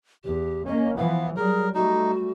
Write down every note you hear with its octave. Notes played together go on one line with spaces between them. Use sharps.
E2 G4
A#3 C#4 D#5
E3 F3 B3 F5
F#3 G3 G#4 A#4
G3 A3 D#4 F#4